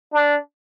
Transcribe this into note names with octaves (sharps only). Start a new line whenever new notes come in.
D4